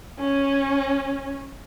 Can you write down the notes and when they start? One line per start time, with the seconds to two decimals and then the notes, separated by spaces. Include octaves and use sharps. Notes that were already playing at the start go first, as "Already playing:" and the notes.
0.19 C#4